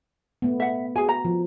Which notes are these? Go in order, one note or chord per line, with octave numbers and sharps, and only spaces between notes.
A3 B3
E5 F#5
F#4 G#4 G#5
A#5
F3